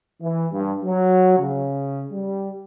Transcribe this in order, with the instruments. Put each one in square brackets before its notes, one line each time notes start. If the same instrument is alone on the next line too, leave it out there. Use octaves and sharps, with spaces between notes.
[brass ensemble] E3
G2
F#3
C#3
G3